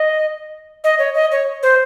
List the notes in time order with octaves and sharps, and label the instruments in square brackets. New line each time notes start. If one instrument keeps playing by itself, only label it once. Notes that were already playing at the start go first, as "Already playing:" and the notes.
Already playing: [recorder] D#5
D#5
C#5
D#5
C#5
C5